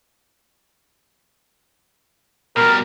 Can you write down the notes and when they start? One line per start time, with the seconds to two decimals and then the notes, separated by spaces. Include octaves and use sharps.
2.57 B2 G3 A#4